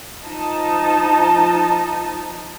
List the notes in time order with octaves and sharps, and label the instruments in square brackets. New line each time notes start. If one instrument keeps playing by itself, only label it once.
[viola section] F3 D#4 D#5 A5